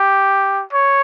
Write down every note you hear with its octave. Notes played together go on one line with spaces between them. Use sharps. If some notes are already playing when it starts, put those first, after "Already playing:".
Already playing: G4
C#5